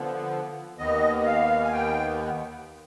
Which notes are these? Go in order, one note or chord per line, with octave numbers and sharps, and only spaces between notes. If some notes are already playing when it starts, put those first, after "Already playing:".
Already playing: D3 F3 B3
D#2 D#3 B3 D#5
D#5
F5
G#5
G5